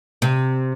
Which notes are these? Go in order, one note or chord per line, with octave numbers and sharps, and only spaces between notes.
C3